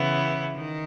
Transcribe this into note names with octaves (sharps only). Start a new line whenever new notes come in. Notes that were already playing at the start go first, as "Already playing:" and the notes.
Already playing: C#3 E3 B3 E4
D#3